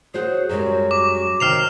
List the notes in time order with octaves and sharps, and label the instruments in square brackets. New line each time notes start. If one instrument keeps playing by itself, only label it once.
[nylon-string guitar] F#4 C5 C#5 [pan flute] G#4
[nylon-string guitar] F#2 G3 G#3 [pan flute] F#4
[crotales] D6
[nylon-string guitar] C3 D#3 G5 [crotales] F6 C7 F7